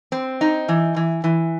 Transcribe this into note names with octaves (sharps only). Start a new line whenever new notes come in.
C4
D#4
E3
E3
E3